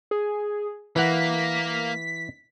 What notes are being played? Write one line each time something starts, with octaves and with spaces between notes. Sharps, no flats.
G#4
E3 A#3 F#5 B6